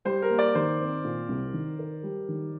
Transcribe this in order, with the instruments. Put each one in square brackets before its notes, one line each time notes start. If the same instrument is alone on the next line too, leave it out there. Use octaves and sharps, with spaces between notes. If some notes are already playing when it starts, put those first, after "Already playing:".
[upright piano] G3 [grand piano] C5
[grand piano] A#4
[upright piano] A#3
[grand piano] D5
[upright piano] D#3 [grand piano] C5
[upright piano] C4
A#2
C2
D#3
A#4
G3
D#3